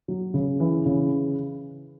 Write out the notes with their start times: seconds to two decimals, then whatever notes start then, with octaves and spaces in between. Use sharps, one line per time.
0.08 F#3
0.34 C#3
0.60 E3
0.86 C#3